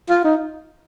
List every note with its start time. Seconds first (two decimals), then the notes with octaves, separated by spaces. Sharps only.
0.10 F4
0.24 D#4